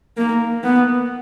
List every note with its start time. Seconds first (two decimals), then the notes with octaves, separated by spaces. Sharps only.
0.17 A#3
0.64 B3